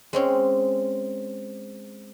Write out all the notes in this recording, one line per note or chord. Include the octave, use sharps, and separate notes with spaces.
G#3 C4 C#4